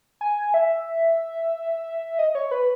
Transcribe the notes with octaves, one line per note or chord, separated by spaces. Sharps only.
G#5
E5
D#5
C#5
B4